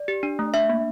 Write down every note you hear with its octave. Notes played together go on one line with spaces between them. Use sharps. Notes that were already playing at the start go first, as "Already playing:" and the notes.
Already playing: D5
G4
D4
A3
D4 E5
A#3